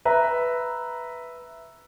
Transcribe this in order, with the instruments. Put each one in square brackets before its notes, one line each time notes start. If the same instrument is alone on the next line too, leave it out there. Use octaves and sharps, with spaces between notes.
[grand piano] B4 E5 A#5